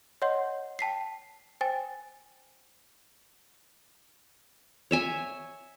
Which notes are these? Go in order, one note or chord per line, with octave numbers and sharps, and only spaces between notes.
C#5 D#5 F#5 C6 G6
G5 A5 B6 C7
C5 G5 G#5 A6
C#5 E5 G#5